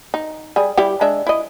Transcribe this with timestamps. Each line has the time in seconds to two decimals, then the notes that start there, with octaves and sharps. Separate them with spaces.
0.14 D#4
0.56 G3 G#4
0.77 G3 E4 G4
1.01 G#3 D4 E5
1.27 E4 D#5